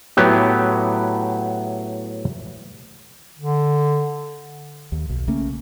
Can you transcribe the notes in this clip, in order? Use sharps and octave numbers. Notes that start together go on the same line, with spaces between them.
A2 F#3 B3 G4
D3
D#2
B1
C#3 A3 A#3 C#4